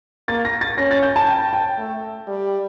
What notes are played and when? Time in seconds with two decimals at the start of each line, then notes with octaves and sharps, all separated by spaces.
0.28 A#3 A6
0.45 A#6
0.61 A6
0.78 C#4 A#6
0.91 A6
1.03 G6
1.16 A5
1.28 G5
1.53 G5
1.78 A3
2.27 G3